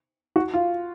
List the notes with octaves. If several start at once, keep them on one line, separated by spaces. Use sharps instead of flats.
F#4
F4